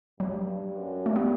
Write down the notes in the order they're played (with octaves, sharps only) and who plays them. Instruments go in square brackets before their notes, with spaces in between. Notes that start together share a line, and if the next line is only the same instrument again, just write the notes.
[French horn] G2 [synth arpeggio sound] F#3
[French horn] G2
F#2
[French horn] G2 [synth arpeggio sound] A3
[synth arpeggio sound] B3